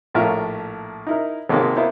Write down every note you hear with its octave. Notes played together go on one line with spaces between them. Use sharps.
A#1 A2 F4 A#4 E5
D#4 E4 A#4
G#1 G#2 C3 A#3 G#4
A#3 B3 E4 C5